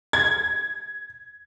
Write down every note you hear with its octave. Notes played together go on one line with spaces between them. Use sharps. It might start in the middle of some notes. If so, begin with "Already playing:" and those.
G#6